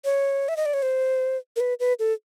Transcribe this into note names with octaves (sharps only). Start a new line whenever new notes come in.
C#5
E5
D#5
D5
C#5
C5
A#4
B4
B4
A4